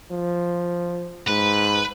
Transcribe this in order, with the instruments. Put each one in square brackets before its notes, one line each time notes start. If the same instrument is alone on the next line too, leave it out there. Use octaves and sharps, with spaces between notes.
[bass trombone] F3
[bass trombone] G#2 [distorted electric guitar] B4